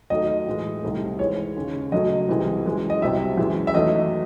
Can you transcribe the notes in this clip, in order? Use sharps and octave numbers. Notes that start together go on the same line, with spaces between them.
D#2 D#3 F#3 A3 D#5
A2 E3 G#3
C2 C3 D#3 A3
G#2 E3 G#3 C#5
D#2 C#3 G#3
F#2 C#3 F#3 A3 D#5
C2 C3 E3 G#3
F#2 E3 G#3
D#5
C2 C3 F#3 E5
F#2 E3 G#3
E5
E2 D#3 F#3 A3 D#5